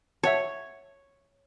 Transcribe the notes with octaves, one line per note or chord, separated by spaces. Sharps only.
C#5 E5 F#5 A5